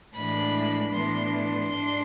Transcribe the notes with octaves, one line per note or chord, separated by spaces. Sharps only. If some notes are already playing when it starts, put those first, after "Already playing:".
A2 E3 G#3 D4 B5
A2 E3 B3 D4 C6
C6
G#2 G#3 D4